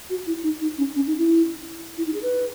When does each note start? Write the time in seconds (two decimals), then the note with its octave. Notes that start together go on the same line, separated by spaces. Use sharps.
0.10 F#4
0.27 E4
0.44 D#4
0.61 D#4
0.78 C#4
0.96 C#4
1.07 D#4
1.18 E4
1.97 E4
2.06 D#4
2.14 G#4
2.23 B4